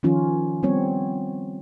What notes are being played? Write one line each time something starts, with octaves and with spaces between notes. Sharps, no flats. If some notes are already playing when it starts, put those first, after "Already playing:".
D#3 F3 C#4 F4
G3 B3 C4 C#5